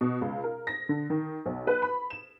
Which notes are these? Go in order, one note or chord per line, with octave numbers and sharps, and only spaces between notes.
B2
C#2
A#4
A#6
D3
D#3
B1
B4
B5
E7